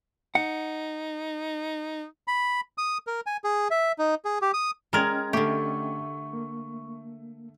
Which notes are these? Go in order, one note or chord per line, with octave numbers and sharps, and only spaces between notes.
D#4 F#5
B5
D#6
A#4
G#5
G#4
E5
D#4
G#4
G4
D#6
G#3 C#4 A#4 D#5 G5 A#5 F6 G#6
D3 A3 G4 C#6
A#3